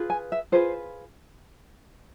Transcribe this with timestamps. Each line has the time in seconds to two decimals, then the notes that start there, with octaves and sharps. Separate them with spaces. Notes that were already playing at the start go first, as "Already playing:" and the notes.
Already playing: F4 G#4 B4
0.10 G#5
0.32 E5
0.52 F4 G#4 B4 C5